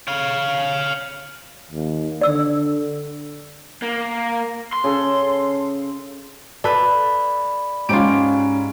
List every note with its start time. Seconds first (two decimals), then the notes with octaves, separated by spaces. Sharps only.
0.08 C#5 F5
1.70 D#2
2.21 D3 D5 E6
3.82 A#3
4.73 C6
4.84 C#3 A4
6.64 A4 B4 D5 B5
7.89 G#2 C#4 F4 G4 D7